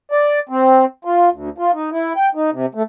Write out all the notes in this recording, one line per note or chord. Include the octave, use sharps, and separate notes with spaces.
D5
C4
F4
D2
F4
D#4
E4
G5
D#4
C3
A3